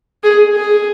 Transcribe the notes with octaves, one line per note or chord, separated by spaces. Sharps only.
G#4
G#4